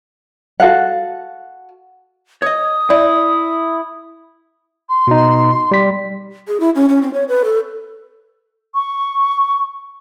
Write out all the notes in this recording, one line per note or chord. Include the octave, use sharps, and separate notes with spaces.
F#4 A4 F5 F#5
C#5 D#5 D#6
E4 D5
C6
B2 D#4
G3 B6
G#4
E4
C#4
C#4
C4
C#5
B4
A4
C#6